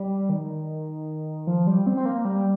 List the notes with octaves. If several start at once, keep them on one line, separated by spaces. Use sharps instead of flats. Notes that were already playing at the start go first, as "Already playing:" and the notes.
Already playing: G3
D#3
F3
G3
C4
C4
A#3
G3